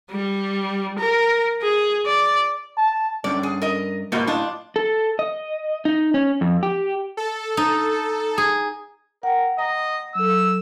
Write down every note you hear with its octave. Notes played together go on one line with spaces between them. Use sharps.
G3
A#4
G#4
D5
A5
G2 C#4 D4 D5
G#4
A#4 D#5
G#2 B2 G3 A#3 F#4
A2 D4 F4 D#5
A4
D#5
D#4
C#4
F2
G4
A4
D#4
G#4
A#4 F#5 G5
D#5 A#5
F#3 A4 E6